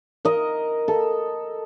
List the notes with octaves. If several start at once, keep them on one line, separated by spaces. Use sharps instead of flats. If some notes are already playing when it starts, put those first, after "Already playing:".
A#4 D#5
A4